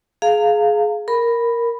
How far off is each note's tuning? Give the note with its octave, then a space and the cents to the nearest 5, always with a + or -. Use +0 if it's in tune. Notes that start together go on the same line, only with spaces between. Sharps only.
G#4 +20 F5 +0 A#5 -35
A#4 +0 B5 +0